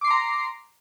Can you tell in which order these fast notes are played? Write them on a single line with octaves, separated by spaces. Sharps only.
D6 C7 C6 A#5